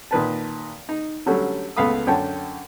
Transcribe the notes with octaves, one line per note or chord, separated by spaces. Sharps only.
A#2 D#3 B4 A5
D#4
D3 F#3 G3 A3 C#4
C#2 A3 B3 F5 B5 D#6
F#2 D3 C#5 G5 A5